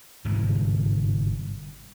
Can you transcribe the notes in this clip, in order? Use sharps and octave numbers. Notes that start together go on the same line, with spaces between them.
G1 G#2 C3 E3